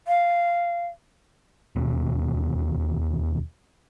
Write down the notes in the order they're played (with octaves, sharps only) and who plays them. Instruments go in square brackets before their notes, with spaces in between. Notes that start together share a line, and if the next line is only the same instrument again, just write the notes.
[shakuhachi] F5
[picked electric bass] E1 D#2 B2